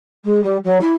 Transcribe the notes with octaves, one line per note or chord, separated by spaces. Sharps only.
G#3
G3
F#3
E4